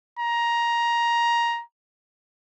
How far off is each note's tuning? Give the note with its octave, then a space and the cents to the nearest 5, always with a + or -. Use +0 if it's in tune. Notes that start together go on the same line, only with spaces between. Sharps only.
A#5 +15